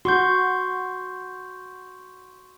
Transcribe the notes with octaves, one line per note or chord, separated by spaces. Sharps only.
F#4 C6 C#6 G6